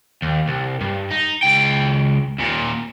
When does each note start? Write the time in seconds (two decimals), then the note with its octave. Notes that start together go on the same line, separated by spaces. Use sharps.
0.22 D#2
0.48 C2
0.81 G2
1.11 D#4
1.43 C#2 G5
2.39 D#2 A#2